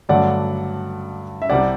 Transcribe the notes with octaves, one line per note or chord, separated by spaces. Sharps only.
G2 D3 F#3 A3 D5 F#5
E5
C2 C3 G3 D5 F#5